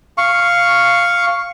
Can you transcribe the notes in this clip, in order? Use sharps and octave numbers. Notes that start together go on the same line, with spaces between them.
F5 C#6